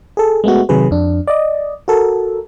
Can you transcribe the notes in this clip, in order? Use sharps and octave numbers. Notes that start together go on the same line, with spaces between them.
G#4 A4
G#3 A3 B3 F#4
C3 D#3 F#3 G#4 B4
F2 D4
D5 D#5
F#4 A4 A#4